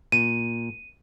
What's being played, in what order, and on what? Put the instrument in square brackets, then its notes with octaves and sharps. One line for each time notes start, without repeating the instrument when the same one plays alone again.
[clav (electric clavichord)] A#2 [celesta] D#7